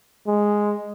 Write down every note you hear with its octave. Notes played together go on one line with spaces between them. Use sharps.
G#3